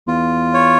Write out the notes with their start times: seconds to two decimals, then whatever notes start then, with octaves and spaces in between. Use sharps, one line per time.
0.07 E2 F4
0.54 C#5